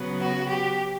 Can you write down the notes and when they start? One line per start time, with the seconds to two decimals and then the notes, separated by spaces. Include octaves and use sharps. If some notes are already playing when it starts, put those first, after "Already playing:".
Already playing: C#3 F#3 B3
0.19 F#4
0.49 G4